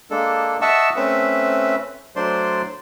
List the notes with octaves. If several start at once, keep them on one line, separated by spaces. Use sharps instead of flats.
G#3 A#3 D4 A4
D#5 E5 F#5 A5 C#6 E6
A3 C4 C#4 B4 E5
F#3 A3 D4 C5 D5 C6